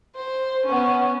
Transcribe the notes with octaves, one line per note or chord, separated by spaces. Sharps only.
C5
B3 C#4